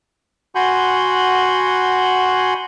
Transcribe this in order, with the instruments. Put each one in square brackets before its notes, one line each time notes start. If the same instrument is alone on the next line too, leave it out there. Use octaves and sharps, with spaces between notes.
[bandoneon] F#4 F#5 G#5 B5 C6 G6